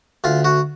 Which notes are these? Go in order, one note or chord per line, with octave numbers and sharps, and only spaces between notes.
D2 F4
F#4